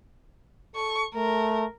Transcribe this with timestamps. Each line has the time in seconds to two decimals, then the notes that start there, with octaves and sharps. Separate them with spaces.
0.76 A4 C#6
1.14 A3 A#4